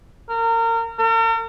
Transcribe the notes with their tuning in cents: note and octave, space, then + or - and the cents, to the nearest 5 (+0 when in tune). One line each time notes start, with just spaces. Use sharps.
A#4 -30
A#4 -45